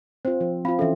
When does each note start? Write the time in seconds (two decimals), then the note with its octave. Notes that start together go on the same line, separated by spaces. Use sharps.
0.25 C4 F4 C5
0.41 F3
0.65 C4 F4 F5 B5
0.79 E3 C#4 A4 E5